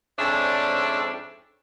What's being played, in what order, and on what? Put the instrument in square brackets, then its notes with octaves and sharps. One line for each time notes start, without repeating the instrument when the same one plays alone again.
[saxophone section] F2 G#2 C#4 D4 D5 E5